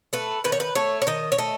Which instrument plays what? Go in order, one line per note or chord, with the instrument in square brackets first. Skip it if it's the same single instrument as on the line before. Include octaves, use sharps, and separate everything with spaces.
[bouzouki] A3 B4
D#3 B4
C#5
B4
A3 C#5
C#5
D#3 D#5
C#5
A3 D#5